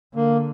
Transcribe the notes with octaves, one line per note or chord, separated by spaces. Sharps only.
D3 A#3